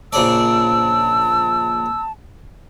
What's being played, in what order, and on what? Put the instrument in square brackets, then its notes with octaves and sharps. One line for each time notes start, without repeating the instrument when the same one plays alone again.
[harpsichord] A#1 C#3 D5 [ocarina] A5 [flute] E6